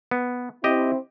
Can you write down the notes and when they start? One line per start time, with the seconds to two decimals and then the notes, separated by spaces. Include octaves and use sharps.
0.11 B3
0.64 C4 E4 G4 D#5